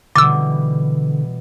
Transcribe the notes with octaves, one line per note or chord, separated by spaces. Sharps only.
B2 D3 E3 G3 D6 E6 A6